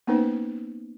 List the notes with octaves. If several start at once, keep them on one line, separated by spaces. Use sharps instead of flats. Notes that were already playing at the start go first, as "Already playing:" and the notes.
A#3 B3 C#4 D#4 B4 C5